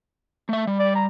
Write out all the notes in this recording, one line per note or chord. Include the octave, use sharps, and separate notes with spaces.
A3 E5
G3
D5
A#5